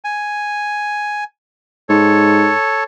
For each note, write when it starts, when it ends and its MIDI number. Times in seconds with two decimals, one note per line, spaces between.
0.05 1.24 80
1.89 2.51 44
1.89 2.84 69
1.89 2.84 73